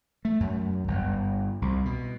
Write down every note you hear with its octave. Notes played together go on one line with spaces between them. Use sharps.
A3
F#2
G1
C2
B2